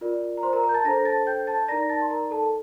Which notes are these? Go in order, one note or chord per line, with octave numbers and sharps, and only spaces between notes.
F4 A#4 D5
A#5
C5 C6
A#4 A#5
A#4 A#5
G6
A5 A6
D4 A4 C5 A#5 A#6
A5 A6
G5 G6
A5 A6
D#4 A#4 D5 A#5 A#6
A5 A6
C6
A#4 A#5
A4 A5